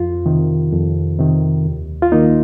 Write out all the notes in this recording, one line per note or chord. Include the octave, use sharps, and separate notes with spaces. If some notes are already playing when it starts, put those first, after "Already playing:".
Already playing: F2 F4
C3 D#3
F2
C3 D#3
D#2
F4
D#3 A#3 D#4